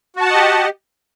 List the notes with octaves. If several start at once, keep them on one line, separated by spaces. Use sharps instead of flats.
F#4 G4 D#5 F#5 A5